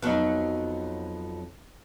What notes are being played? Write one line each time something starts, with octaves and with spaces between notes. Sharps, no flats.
F2 F#3 B3 D#4